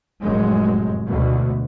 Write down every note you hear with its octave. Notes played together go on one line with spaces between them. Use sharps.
F1 F#2 A2 G#3
D2 B2